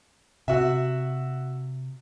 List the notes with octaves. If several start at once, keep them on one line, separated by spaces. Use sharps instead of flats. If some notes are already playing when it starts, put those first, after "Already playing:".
C3 F#4 E5